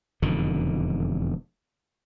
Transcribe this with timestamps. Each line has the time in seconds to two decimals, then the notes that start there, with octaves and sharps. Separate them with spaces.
0.22 E1 F2 D3 D#3